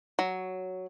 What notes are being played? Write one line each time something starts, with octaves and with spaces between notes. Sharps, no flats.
F#3